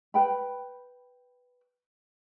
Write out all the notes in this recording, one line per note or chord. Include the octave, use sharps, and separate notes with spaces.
B4 G5 B5